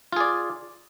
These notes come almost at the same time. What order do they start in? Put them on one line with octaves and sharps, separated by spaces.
F4 G#4 D5